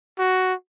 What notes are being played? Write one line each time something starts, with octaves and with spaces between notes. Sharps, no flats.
F#4